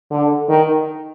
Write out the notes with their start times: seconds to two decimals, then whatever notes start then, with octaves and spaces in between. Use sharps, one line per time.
0.11 D3
0.49 D#3